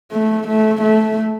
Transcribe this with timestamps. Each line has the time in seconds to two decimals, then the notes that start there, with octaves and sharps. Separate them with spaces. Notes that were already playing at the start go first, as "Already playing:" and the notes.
0.12 A3
0.47 A3
0.81 A3